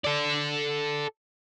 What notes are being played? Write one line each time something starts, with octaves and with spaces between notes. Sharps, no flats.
A4 D5